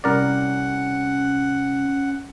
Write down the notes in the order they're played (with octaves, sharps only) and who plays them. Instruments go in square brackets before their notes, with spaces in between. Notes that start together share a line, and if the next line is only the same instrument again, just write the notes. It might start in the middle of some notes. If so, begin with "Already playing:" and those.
[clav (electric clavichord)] C2 A#4 D5 [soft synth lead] C#4 [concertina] F#5